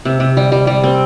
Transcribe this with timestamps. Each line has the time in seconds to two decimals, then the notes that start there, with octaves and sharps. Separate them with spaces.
0.05 C3
0.20 C3
0.37 G3
0.52 G3
0.67 G3
0.84 C4